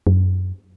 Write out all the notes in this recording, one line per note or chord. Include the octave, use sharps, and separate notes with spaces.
F#2